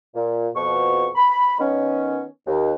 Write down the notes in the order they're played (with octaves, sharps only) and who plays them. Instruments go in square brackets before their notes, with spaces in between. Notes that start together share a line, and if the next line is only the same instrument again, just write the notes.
[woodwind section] A#2
F2 B2 C#6
B5
D#3 B3 C#4
D#2